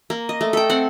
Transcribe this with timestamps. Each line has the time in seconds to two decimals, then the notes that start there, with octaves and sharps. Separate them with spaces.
0.10 A#3
0.29 D#5
0.41 A3
0.53 A4 G5
0.70 C4 F#5